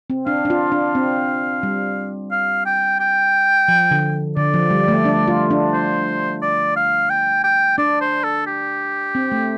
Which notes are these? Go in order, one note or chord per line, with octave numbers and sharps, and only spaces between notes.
C4
D4 F5
D4
F4
D4
C4
G3
F5
G5
G5
F3
D3
D3 D5
F3
G3
A3
D4
F4
D4
C5
D5
F5
G5
G5
D4 D5
C5
A4
G4
C4
A3